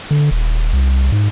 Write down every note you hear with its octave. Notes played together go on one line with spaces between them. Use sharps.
D3
D#1
C2
G#2